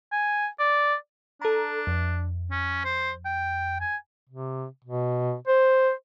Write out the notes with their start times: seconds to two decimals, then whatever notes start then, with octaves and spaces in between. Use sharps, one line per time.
0.12 G#5
0.59 D5
1.42 D4 A4 A#5
1.87 F2
2.51 C#4
2.85 C5
3.25 G5
3.81 G#5
4.29 C3
4.84 B2
5.47 C5